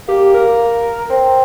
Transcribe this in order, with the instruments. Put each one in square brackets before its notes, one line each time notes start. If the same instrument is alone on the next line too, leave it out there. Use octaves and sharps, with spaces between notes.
[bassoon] A#3 [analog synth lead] G4
[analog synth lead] A#4
[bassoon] C4